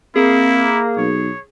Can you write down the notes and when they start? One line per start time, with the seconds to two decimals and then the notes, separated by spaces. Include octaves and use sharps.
0.16 A#3 C4 E4 G#4
0.97 B1 C#5